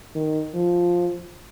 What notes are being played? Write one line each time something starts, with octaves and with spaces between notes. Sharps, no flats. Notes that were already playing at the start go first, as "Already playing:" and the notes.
D#3
F3